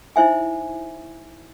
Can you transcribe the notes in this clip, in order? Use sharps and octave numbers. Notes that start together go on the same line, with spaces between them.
D#4 E4 C5 E5 G#5